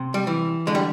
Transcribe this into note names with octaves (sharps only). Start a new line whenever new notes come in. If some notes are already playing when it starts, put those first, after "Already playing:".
Already playing: C3
G3
E3
D3 G#3
G3